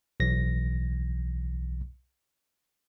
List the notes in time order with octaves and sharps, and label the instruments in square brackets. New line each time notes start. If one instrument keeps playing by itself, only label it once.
[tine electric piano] B1 E3 A#6